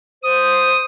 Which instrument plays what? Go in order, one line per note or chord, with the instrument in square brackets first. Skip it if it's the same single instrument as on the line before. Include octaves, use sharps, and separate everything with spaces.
[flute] C5 [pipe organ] D#6